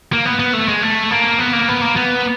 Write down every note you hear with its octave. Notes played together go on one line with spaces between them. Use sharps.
A#3
B3
B3
A3
G#3
A3
A#3
B3
A#3
B3
A#3
B3